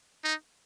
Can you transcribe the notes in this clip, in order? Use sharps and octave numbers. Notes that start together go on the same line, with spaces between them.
D#4